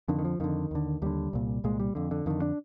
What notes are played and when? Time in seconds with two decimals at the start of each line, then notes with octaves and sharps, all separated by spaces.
0.08 F2 D3 D#3
0.19 D#3
0.25 F3
0.40 F2 D3 D#3
0.71 D#2 D3
1.02 D#2 D3 G3
1.33 C2 A#2
1.64 C2 A#2 G#3
1.80 G3
1.95 F2 D3
2.11 D3
2.26 F2 D3 D#3
2.42 D4